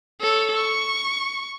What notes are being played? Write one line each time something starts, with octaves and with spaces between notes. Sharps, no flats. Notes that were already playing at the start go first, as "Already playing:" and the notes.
A4 C#5
C#6